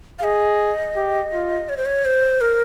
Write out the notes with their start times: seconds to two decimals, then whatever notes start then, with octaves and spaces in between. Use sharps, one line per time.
0.19 F5
0.23 G#4 D#5
0.96 G4
1.33 F4
1.69 C#5
1.77 C5
1.86 C#5
2.05 C5
2.41 A#4